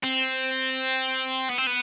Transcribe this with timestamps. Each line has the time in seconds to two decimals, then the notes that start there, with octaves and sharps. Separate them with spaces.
0.04 C4
1.49 B3
1.58 C4
1.67 B3